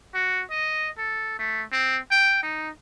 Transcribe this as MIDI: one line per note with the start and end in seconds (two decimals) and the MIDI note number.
0.15 0.43 66
0.51 0.89 75
0.98 1.37 69
1.39 1.64 57
1.72 1.98 60
2.11 2.41 79
2.43 2.69 63